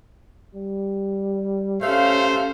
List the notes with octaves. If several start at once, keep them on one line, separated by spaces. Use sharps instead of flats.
G3
A3 C#4 G4 C5 F5